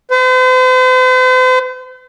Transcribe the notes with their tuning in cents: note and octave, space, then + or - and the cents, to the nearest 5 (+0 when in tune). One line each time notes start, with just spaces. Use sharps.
C5 -45